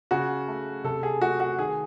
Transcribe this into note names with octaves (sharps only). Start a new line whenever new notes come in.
C#3 F#4
A3
C3 A4
G#4
A3 F#4
F#4
D#3 G#4